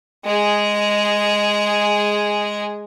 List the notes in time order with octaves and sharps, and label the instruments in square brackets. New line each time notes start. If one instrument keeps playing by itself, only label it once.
[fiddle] G#3 G#4